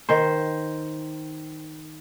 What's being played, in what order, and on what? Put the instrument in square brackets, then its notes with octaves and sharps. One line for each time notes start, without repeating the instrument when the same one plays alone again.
[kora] D#3 C5